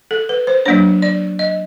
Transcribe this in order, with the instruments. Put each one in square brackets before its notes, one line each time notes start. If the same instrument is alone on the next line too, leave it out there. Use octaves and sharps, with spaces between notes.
[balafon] A4
B4
C5
F#3 A#3 D4 C#5
D5
D#5